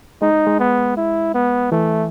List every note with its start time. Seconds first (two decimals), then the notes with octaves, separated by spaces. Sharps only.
0.22 G#3 D#4
0.47 G#3
0.60 B3
0.97 E4
1.34 B3
1.72 E3 A3